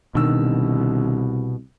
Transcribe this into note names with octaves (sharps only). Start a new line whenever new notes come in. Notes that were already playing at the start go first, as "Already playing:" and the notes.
C2 B2 D3 D#3 E6